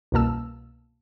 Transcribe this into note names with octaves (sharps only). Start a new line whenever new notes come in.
C2 F#2 B2 A#3 A5 E6